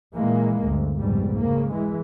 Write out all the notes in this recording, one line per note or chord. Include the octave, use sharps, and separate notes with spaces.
A#2 E3 G#3 A#3
G1 D2
F1 C#2 G#2 B2 G3
C#3 A#3
E3 G#3